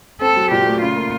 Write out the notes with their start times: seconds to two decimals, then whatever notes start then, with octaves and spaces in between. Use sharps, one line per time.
0.21 C4 A4
0.36 F#3
0.51 A#2 G4
0.66 A3
0.81 C#3 F4
0.96 A#3